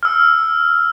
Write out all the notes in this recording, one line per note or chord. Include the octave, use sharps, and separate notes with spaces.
E6 F6